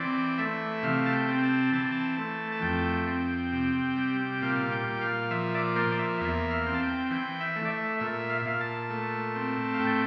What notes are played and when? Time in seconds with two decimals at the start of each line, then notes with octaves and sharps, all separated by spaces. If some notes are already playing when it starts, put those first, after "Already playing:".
Already playing: E3 C4 D5
0.38 A3 E5
0.83 C3 F5
1.06 A5
1.13 G5
1.29 C4
1.42 A5
1.72 E3 A5
1.92 A5
2.18 A3
2.52 A5
2.62 F2 G5
3.08 C4
3.53 C3
3.96 G3
4.42 A#2 F5
4.72 G5
4.87 A#2
5.01 F5
5.31 F3 E5
5.54 D5
5.76 A#3 C5
5.92 D5
5.99 E5
6.21 E2 E5
6.50 F5
6.67 C4
6.74 A5
6.81 G5
7.11 E3 G5
7.40 E5
7.56 A3
7.65 D5
7.70 E5
8.00 A#2 E5
8.30 F5
8.38 E5
8.46 A#2 F5
8.61 A5
8.90 A3
9.35 C4
9.74 F5
9.79 A2 G5